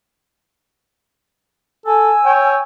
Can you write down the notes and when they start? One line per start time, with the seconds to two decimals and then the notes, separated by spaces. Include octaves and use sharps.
1.86 A4 G#5 E6
2.25 C#5 G5